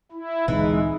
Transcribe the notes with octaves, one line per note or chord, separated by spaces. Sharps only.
E4
D2 A#2 E3 G#3 C4 D#4